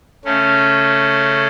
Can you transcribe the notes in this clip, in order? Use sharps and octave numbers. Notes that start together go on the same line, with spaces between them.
C#3 A3 C#4